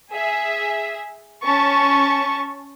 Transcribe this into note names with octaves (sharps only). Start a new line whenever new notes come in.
G#4 E5
C#4 A5 C#6